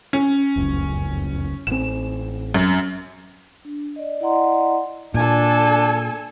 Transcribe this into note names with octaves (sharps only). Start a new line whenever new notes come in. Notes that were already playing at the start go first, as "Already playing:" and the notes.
C#4
F1 C#2 F#2
A1 C4 E7
F#2
D4
D5 D#5
E4 D5 D#5 F#5 A#5 C6
A#2 D4 A4 G#5